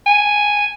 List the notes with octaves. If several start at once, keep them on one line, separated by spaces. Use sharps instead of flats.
G#5